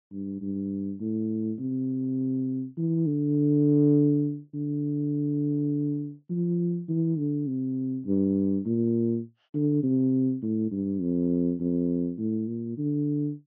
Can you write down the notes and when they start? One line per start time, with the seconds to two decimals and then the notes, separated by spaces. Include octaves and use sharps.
0.12 G2
0.41 G2
1.00 A2
1.59 C3
2.77 E3
3.07 D3
4.54 D3
6.30 F3
6.89 E3
7.18 D3
7.47 C3
8.06 G2
8.66 A#2
9.54 D3
9.83 C3
10.42 A2
10.71 G2
11.01 F2
11.60 F2
12.18 A2
12.47 A#2
12.77 D3